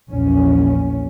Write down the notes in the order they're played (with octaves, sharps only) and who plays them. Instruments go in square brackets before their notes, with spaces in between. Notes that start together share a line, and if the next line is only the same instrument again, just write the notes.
[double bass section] A#1 E2 C#4